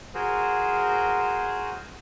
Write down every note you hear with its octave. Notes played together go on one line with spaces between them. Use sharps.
F#4 G#4 A#4 C5